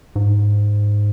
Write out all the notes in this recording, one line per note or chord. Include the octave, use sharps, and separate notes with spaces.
G#2